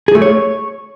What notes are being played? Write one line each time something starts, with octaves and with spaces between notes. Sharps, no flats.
G#4
A3
C#5